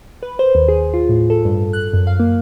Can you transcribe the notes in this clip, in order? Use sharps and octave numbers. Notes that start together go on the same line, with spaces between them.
B4
C5
D#2
G#4
F4
A2
A4
G2
F#6
F#2
F5
A#3